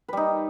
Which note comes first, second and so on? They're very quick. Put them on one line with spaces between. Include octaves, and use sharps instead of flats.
B4 G3 D#4